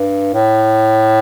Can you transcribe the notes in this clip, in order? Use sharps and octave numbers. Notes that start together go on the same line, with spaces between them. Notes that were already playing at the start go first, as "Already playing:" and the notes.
Already playing: G2
A2